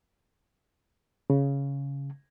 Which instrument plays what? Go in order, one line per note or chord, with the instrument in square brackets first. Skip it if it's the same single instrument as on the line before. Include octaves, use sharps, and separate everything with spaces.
[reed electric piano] C#3